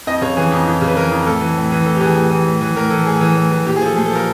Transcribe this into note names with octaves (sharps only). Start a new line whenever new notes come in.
F2 D#5
C#3 C#5
E3 G#4
F2
F2
C#3
B4
E3 A#4
F2
A#4
A2 A4
E3
A2
E3
A2 A4
G4
E3
G#4
A2
E3
A2
E3
A2 A#4
E3 A4
A2 G#4
E3
A2
E3
A#2 G4
G#4
F3 A4
A#2 G#4
A4
F3 A#4